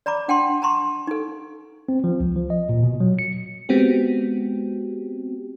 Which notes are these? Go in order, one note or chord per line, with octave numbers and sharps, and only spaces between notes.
D5 A#5 B5 D6
D4 F#5 G5 A5 C6
A5 A#5 C6 C#6
D#4 A4
C4
F3
C#2
F3
D#5
A#2
B2
F#3
C#7
G#3 B3 C4 F#4 G4